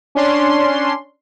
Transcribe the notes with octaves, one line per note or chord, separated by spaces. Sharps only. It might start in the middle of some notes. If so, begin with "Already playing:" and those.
C#4 D4 C6